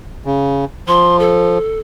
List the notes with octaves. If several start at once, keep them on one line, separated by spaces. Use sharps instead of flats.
C#3
F3 C6
A4